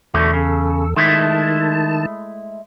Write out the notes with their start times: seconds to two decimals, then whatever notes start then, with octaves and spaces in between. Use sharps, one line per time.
0.14 E2 B2 D3 A3 A4
0.33 C#3
0.96 D#3 G#3 A3 E4 A5